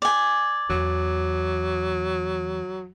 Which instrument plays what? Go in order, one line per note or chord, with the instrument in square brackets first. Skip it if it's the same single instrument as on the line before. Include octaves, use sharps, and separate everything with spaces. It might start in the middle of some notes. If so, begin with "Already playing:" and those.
[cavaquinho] D5 G#5
[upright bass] E2 [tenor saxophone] F#3